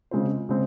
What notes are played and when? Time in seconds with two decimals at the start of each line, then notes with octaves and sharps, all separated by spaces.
0.11 C#3 G#3 C4 F4 C5
0.49 C#3 G#3 C4